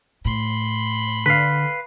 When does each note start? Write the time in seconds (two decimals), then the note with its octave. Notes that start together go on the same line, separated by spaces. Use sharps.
0.25 A2 B5 C6
1.26 D3 B4 F5